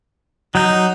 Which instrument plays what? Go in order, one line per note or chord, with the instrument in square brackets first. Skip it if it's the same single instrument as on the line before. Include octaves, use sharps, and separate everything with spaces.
[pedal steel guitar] F#3 G6 [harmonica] D#4